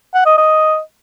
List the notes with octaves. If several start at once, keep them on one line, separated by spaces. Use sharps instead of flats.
F#5
D#5
D#5